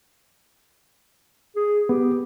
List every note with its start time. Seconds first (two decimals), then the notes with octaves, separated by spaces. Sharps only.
1.56 G#4
1.89 B3 G4